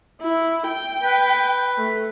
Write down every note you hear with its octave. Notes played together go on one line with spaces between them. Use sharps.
E4
G5
B4
A3